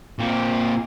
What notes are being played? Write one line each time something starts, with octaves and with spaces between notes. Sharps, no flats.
A#2 C4